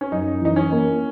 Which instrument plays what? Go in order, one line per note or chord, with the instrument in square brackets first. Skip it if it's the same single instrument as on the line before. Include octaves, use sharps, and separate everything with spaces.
[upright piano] C#4
[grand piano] F#2 [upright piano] D#4
[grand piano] E3 [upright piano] D#4
[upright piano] C#4
[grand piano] A#3